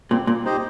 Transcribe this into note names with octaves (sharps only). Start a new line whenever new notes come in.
A#2 C4
A#2
D#4 G4 C5 D#5